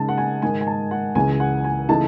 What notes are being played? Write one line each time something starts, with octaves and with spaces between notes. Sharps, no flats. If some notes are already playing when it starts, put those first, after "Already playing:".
Already playing: C#3 G#3 D#4 A5
F#5
G#5
G#2 D#3 G#3 D#4 G#5
G#5
A5
F#5
C#2 C#3 E3 G#3 G#5
F#5
G#5
C#3 E3 A3 D#4 A5